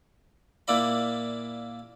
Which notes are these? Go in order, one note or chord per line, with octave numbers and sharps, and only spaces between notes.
A#2 A#3 E4 D5 B5